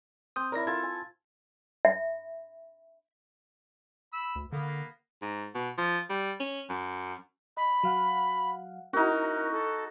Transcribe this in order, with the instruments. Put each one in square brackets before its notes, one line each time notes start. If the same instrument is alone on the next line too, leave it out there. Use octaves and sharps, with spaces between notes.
[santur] C4 [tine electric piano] D#6 G6
[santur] E4 A#4 [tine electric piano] C#5 D5 A#6
[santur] F4 A4 [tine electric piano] G#6 A6
[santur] G#5
[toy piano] E5
[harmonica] B5 E6
[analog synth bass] D2
[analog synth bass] D3 [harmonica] A#3 B3
[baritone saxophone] G#2
B2
F3
G3
C#4
F#2
[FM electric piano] D#5 [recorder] B5
[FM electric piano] F#3 F5 F#5
[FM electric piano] C#4 E4 [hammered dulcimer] D#4 F#4 [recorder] A#4
[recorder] A4